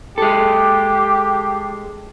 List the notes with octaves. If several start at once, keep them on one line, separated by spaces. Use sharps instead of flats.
G#3 G4 A4